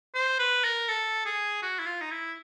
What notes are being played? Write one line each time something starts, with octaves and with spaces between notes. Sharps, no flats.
C5
B4
A#4
A4
G#4
F#4
E4
F4
D#4
E4